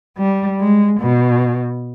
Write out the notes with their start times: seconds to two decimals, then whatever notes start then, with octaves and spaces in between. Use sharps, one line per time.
0.18 G3
0.60 G#3
1.00 B2